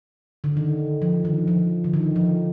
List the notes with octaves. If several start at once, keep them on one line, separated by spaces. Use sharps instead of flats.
D3
D#3
F3
D#3
F3
D3
D#3
F3